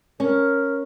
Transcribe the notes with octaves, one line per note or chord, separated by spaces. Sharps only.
C#4 A#4